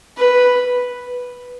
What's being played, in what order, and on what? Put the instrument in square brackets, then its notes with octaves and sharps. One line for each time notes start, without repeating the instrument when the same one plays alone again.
[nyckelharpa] B4